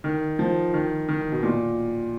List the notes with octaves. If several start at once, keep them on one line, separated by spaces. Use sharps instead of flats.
D#3
F3
D#3
D#3
B2
A#2